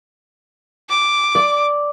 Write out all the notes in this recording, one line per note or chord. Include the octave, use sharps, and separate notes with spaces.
D6
D5